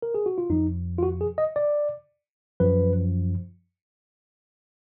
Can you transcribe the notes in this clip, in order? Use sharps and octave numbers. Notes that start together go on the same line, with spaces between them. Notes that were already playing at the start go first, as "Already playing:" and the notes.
A#4
G#4
F#4
F4
F2 F3 D#4
F4
F#4
G#4
D#5
D5
F#2 F3 B4